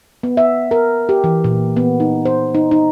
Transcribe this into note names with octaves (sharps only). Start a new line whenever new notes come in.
B3
E5
A#4
G4
E3
A#2
B3
D#4
C5
D#4
D#4